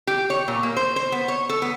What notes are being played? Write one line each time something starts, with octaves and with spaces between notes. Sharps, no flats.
G4
C#5
A#2
A#3
C5
C5
B3
C#5
A4
B3